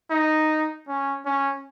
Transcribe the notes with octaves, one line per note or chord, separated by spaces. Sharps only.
D#4
C#4
C#4